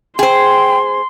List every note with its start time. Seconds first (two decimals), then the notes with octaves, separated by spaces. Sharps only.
0.19 G#4 C5 G5 C6